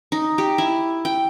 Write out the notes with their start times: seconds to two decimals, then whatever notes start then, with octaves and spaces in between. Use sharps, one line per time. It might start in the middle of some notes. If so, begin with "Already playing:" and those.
0.12 D#4
0.38 G4
0.58 E4
1.05 G5